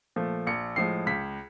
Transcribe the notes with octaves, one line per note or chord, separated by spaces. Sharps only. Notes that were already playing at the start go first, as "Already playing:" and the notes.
A#2 F3 A3
A#1 C#7
A2 F3 G#3 C7
C#2 B6